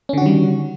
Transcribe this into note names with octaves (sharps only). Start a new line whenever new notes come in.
D3 D#3 G3 C#4 F#4